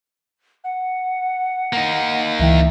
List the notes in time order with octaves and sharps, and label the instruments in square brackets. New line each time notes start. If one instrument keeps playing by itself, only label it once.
[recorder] F#5
[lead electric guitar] A#3 D#4
[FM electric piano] C#2 E3 G5 [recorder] E5